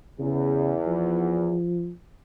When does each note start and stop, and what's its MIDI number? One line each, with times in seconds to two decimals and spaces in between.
0.19 1.57 40
0.19 0.73 49
0.87 1.91 53